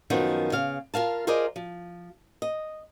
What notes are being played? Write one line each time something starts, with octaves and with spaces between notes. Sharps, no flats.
F#2 D#3 F3 B3
C#3 F5
F4 A#4 F5 A5
F4 G#4 A#4 C5 D5 D#5
F3
D#5